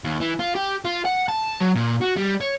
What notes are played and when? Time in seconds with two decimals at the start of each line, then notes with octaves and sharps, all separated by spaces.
0.04 D#2
0.21 E3
0.40 F4
0.55 G4
0.85 F4
1.05 F#5
1.28 A5
1.61 F#3
1.76 A#2
2.02 F#4
2.17 G3
2.41 C#5